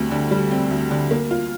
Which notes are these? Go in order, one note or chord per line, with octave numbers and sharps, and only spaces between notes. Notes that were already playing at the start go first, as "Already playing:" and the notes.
Already playing: D2 G3 C4
D3
G3
C4
D2
D3
A#3
F4